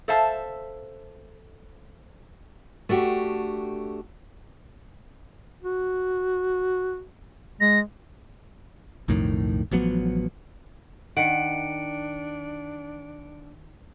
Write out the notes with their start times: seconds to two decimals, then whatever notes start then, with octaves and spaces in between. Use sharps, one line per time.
0.08 A4 C5 E5 F5 A5
2.89 A3 D4 F#4 G4
5.63 F#4
7.61 G#3 A#6
9.08 B1 F2 A2 D#3
9.71 A1 F3 F#3 B3
11.17 D#3 D4 F#5 C#7 D7